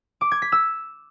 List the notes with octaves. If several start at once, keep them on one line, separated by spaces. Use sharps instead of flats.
D6
G#6
B6
E6